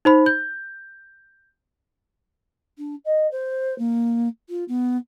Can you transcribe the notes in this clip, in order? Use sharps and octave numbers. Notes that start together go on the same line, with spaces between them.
D#4 C5 B5
G6
D4
D#5
C5
A#3
F4
B3